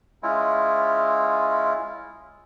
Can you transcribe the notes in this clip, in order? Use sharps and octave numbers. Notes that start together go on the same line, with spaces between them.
G#3 C#4 E4 F4